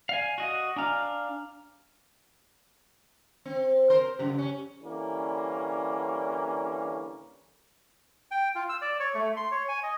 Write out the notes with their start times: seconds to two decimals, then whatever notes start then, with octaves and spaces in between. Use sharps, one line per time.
0.09 D5 F5 G#5
0.38 F#4 D#5
0.76 D4 F5 G#5 A#5 F6
3.46 C4
3.90 A#4 C5
4.19 F#2 C#3 G4
4.38 C#4
4.83 D3 E3 G3 A#3 C#4
8.31 G5
8.55 F4
8.69 E6
8.82 D5
9.00 C#5
9.15 A3
9.36 C6
9.52 C#5
9.68 G#5
9.83 D#5